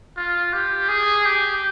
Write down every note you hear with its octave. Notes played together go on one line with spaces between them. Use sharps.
F4
G4
G#4
G4